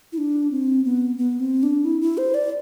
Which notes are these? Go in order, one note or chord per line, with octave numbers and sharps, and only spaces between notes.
E4
D4
C4
B3
B3
C4
D4
E4
E4
C5
D5